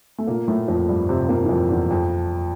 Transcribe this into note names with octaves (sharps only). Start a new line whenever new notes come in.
A3
A#2 A#3
A2 A3
F2 F3
G2 G3
C3 C4
A#2 A#3
E3
F2 F3
E2 E3
F2 F3